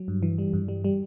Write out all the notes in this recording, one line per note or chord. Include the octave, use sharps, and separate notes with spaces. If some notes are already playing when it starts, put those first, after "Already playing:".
Already playing: F#3
G2
E3
G3
G2
G3
G3